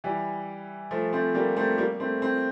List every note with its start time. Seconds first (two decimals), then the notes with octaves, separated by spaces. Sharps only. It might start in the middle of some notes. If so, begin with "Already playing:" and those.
0.04 E3 G3
0.91 F3 A3
1.13 A3 C4
1.34 G3 A#3
1.56 A3 C4
1.78 G3 A#3
2.00 A3 C4
2.22 A3 C4